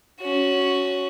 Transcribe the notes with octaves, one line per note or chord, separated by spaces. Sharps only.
C#4 F#4